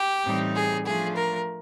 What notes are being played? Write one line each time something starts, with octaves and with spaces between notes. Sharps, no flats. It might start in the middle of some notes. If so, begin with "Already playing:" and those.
Already playing: G4
A2 E3 G3 C4 D#4
G#4
F3 A3 D4 F4 G#4
A#4